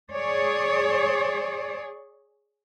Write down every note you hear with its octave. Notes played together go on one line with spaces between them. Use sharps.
G#4 C#5 D5